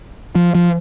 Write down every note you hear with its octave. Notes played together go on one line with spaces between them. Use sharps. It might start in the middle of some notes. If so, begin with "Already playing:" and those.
F3
F3